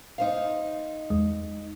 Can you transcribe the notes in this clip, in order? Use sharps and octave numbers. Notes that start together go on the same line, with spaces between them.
D#4 C5 F5
E2 G#3